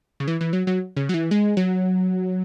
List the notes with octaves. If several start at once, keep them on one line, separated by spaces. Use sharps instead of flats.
C#3
E3
E3
F#3
F#3
C#3
F#3
E3
G#3
F#3